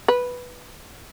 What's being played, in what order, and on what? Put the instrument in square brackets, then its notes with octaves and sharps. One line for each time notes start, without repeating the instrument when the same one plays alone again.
[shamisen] B4